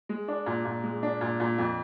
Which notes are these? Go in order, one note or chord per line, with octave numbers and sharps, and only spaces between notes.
G#3
D4
A#2
A#2
G#3
D4
A#2
A#2
F2